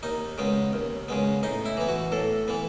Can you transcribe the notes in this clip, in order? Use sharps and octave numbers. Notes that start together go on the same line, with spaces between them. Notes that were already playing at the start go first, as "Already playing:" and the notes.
D#2 D#4
C#3 G#3 B3
D#2
C#3 G#3 B3
A2 D#4
E4
E3 B3
F#4
A2 A4
E3 B3